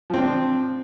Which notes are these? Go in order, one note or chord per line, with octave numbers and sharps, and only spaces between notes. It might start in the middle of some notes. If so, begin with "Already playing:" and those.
F3 C4 D4